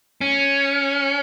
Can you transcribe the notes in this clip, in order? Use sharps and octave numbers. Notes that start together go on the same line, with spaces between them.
C#4